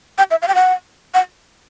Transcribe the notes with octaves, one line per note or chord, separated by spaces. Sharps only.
G5
E5
F5
G5
F#5
F#5